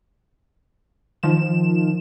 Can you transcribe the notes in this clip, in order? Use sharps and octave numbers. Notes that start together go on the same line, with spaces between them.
D#3 F3 E7